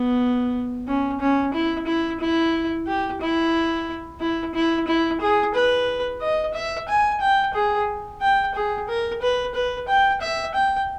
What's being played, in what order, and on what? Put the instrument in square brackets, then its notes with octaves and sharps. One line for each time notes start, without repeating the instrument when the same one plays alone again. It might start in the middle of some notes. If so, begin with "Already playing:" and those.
Already playing: [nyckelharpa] B3
C#4
C#4
E4
E4
E4
G4
E4
E4
E4
E4
G#4
B4
D#5
E5
G#5
G5
G#4
G5
G#4
A#4
B4
B4
G5
E5
G5